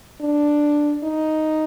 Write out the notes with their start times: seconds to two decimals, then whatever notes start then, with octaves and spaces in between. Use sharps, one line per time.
0.21 D4
1.03 D#4